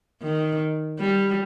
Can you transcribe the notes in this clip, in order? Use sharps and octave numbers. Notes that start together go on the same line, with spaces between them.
D#3
G3